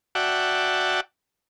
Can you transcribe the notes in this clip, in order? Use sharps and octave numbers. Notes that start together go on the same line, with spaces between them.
F#4 D5 E5 F#5 G5 A5